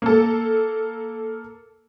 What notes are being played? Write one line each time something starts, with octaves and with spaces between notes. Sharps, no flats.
A#3 A4